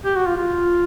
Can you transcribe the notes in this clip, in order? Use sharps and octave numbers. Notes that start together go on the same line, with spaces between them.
G4
F#4
F4
F4